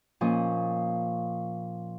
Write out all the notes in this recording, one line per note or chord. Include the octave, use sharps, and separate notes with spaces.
A#2 F3 C#4 D#5